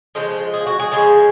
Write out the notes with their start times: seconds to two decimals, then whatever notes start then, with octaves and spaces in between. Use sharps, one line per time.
0.15 C#3 F3 G#3 F4
0.54 G#4
0.67 F#4
0.80 G#4
0.92 C#3 F3 G#3